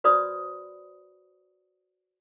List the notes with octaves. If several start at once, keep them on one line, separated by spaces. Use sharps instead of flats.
F#4 B4 C5 D5 B5 D#6